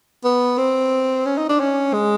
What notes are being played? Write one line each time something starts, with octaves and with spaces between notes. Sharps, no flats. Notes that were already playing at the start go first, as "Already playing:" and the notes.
B3
C4
C#4
D#4
D4
C#4
G#3